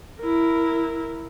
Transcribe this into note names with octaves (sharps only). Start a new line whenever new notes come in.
E4 A#4